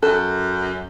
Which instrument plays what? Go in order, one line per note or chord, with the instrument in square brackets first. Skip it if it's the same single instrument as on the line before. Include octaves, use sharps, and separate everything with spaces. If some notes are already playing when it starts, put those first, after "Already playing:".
[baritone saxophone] F#2 [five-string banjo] A4 [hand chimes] F#6